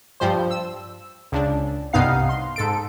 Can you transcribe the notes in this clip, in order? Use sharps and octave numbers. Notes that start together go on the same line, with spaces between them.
G2 F3 C5
E6
C#2 D4
C2 G2 B3 D#4 F5 C7
C6
G#2 A4 D7